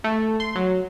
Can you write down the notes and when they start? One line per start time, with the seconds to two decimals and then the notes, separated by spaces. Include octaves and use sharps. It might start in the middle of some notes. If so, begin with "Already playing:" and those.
0.04 A3
0.40 C6
0.56 F#3